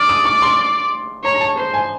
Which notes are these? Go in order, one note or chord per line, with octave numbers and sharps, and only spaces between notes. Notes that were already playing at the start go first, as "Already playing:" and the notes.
Already playing: D5 F6
D#6
C#6
C6
C#5 A#5
A#5
A5
C5
G#5